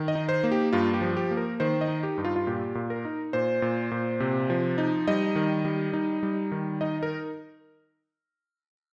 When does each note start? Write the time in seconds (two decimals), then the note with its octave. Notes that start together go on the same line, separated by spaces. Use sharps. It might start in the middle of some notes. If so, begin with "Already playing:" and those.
Already playing: D#3
0.08 D#5
0.15 D#4
0.29 C5
0.44 A#3
0.52 G4
0.73 G2 F4
0.94 G4
1.01 F3
1.17 G4
1.31 A#3
1.37 A#4
1.60 D#3 C5
1.81 D#5
1.88 D#4
2.03 G4
2.18 G2
2.25 F4
2.36 F4
2.47 A#2 G4
2.75 A#2
2.90 A#4
3.05 D#4
3.33 A#2 C5
3.62 A#2
3.91 A#2
4.20 C3
4.50 F3
4.78 D#4
5.08 G3 D#5
5.36 D#3
5.65 G3
5.93 D#4
6.23 G3
6.52 D#3
6.81 D#4 D#5
7.03 A#4